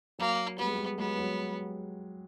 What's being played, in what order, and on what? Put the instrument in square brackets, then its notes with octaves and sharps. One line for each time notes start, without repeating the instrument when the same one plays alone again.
[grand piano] F#3 [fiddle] A#3
[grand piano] G3 [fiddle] B3
[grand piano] G#3
G3
[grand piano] F#3 G#3 [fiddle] B3
[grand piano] F#3 G#3